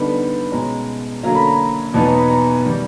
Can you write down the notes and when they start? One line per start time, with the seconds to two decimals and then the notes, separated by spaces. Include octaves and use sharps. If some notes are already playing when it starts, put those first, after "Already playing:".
Already playing: D3 G3 B3 D#4 B5
0.52 B2 G#3 C#4 A#5
1.23 D3 F#3 A#3 C#4 A#5
1.35 B5
1.47 A#5
1.94 E2 B2 F#3 B3 D#4 A5
2.06 A#5
2.18 B5
2.30 A#5
2.65 D#3 G3